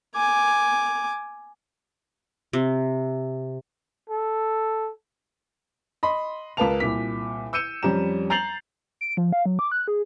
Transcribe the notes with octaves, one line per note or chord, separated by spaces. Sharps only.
G#5 D6
C3
A4
D#5 B5 C6
C#2 A#4 B4 F5 A5 F7
C2 A#2 B6
E6 G6 C#7 D#7 E7
F2 G3 C#4 A#5 E7
A#5 G6 A6 C7 F7 F#7
D7
F3
F5
F#3
D6
F#6
G#4